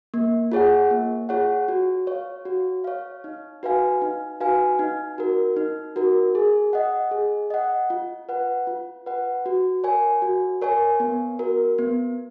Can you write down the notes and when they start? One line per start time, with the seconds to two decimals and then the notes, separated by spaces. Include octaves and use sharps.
0.14 A#3
0.52 F4 G#4 C#5 F#5
0.90 A#3
1.29 F4 G#4 C#5 F#5
1.68 F#4
2.07 C#5 F5
2.45 F#4
2.84 C#5 F5
3.24 D#4
3.63 F#4 B4 F5 G#5
4.02 D#4
4.40 F#4 B4 F5 G#5
4.79 D#4
5.18 F#4 A#4
5.57 D#4
5.96 F#4 A#4
6.35 G#4
6.73 D#5 F#5
7.11 G#4
7.50 D#5 F#5
7.90 F4
8.29 B4 F#5
8.67 F4
9.06 B4 F#5
9.46 F#4
9.84 A#4 C#5 G#5
10.22 F#4
10.62 A#4 C#5 G#5
11.00 B3
11.39 F#4 A#4
11.78 B3